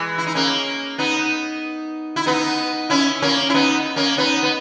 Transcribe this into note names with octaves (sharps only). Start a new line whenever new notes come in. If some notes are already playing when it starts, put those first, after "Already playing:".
Already playing: E3 G#3
E4
D#4
A#3 C#4
B3 D#4
E4
B3 D#4
C#4 E4
A#3 C#4
E4
B3 D#4
A#3 C#4
B3 D#4
B3